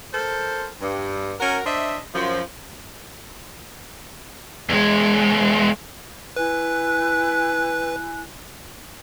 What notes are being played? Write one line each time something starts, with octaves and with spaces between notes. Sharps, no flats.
A4 A#4 C5
G2
C#4 F#4 A#4
D4 C5 D#5 E5
F#2 F3
E2 G#3
E4 B4 G#5 F#6